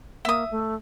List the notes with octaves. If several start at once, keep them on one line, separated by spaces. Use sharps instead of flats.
A#3 E5 D#6
A3